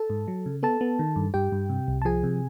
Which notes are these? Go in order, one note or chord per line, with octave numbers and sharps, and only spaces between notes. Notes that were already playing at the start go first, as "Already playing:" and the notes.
Already playing: A4 A5
G#2
F#3
C#3
B3 A4 A5
B3
D#3
G2
G2 G4 G5
G2
C3
C2
A5
F3 G#4 G#5
C3